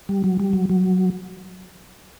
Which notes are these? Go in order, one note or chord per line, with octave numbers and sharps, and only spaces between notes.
G3
F#3
G3
F#3
F#3